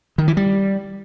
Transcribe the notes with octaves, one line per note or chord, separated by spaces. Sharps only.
D#3
E3
G3